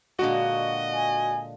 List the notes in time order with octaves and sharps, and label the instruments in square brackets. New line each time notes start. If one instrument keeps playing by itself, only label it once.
[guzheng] A#2 D3 G#3 [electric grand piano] F#4 [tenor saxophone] D#5
[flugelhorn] G#5